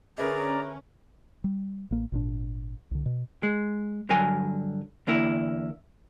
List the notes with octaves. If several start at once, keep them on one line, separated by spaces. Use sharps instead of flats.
D3 C#4 G#4 A#4 B4 D5 E5 A#5
G3
A1 A#3
G#1 A#2 D4
C2 D3
B2
G#3
G2 D3 F#3 A#4 G#5
E2 D3 A#3 E4